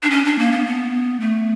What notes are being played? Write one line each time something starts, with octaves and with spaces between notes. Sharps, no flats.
D4
C#4
D4
A#3
B3
B3
A3